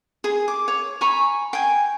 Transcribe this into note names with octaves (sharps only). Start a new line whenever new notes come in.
G#4
D6
C#5
G#5 A#5 B5 C#6
G5 G#5